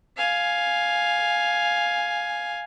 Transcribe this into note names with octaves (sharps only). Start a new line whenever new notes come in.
F5 G#5